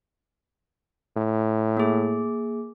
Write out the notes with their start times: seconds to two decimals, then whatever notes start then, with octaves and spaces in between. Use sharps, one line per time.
1.17 A2
1.77 A#3 G#4